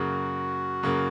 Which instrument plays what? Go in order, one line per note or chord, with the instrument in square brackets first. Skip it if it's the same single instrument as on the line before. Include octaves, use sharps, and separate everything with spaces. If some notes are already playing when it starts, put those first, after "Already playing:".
Already playing: [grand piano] F#2 C#3 A#3 [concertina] F#4
[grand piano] F#2 C#3 A#3